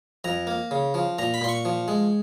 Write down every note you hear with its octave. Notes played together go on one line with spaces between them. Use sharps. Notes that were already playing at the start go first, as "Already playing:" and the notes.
F2 A#5
A#3
C#3
F3
A#2 A#5
B5
A#2 C6
C#6
F3
G#3